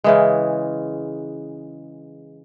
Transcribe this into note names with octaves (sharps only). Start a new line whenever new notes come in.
C#3 E3 G#3